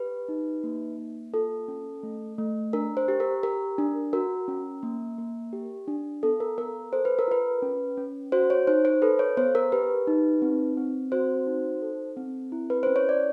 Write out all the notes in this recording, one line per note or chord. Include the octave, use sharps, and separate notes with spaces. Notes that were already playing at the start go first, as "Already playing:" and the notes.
Already playing: G4 B4
D#4
A#3
A#3
F4 A4
C#4
A3
A3
D4 A#4
C5
G4
A#4
G4 A#4
D4
F#4 A#4
C#4
A#3
A#3
G4
D4
B3 A4
A#4
B3 A#4
A4 C5
B4
A#4
F4 B4
C#4
C#4
F#4 C5
C#5
D#4 C5
C5
A4 B4
C#5
B3 C5
A#4
G4 B4
D#4
C4
C4
F#4 C5
D#4
A4
C4
E4
B4
C#4 C5
C#5
D5